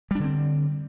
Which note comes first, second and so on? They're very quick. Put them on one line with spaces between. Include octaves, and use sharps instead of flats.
G3 D4 D3 C4